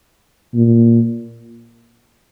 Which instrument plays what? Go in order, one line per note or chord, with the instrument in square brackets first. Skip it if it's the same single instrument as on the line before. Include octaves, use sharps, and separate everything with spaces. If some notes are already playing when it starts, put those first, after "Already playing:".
[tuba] A#2